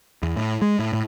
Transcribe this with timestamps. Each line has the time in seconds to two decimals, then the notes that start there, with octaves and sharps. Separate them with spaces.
0.23 E2
0.37 A2
0.62 G#3
0.79 A2
0.93 A2